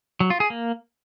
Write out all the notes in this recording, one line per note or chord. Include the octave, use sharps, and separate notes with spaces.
F#3
F4
G#4
A#3